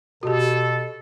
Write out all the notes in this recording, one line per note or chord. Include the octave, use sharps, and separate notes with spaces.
B2 F#4 G4 A4